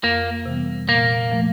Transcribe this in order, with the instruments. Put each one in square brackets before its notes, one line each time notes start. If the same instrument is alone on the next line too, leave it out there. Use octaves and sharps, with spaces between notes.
[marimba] F2 [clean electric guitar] A#3
[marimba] C3 E3 G3 B3
[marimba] A#2 [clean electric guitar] A#3
[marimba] F3 A3